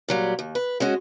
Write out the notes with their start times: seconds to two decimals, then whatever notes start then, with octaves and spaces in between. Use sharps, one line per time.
0.08 A#2 F#3 G3
0.39 D#2
0.55 B4
0.80 G#3 C#4 F#4